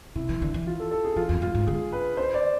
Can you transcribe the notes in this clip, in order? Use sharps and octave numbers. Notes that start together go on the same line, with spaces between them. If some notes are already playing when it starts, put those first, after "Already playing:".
C3 E4
E3
D3
E3
F4
A4
A4
G#4
E3 F4
F2
G#2 F4
G#2
D3 G#4
B4
C5
D5